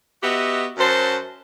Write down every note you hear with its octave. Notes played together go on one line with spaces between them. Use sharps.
B3 F#4 G4 D#5 E5
F#2 F#3 C5 A5 C6